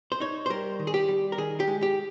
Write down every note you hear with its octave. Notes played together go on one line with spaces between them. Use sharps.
C5
D#4 C#5
C5
G3 A#4
D#3
G#4
G4
G3
A#4
D#3 G#4
G4
G#3
G4